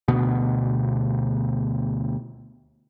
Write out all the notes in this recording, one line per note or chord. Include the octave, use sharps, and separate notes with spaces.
D2 B2 B3